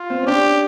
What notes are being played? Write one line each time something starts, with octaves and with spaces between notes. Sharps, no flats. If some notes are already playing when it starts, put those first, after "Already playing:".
Already playing: F4
C4
C#4
D4 G4